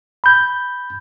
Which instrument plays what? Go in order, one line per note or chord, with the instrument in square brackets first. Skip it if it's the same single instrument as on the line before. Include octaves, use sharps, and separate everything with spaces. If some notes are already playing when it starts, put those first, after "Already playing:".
[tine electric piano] B5 G6